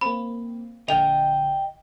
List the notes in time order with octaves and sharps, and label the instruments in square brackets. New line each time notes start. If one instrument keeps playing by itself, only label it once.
[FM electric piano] A#3 C4 [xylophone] B5
[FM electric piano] A#1 D3 [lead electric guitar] D#5 G5 [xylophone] F7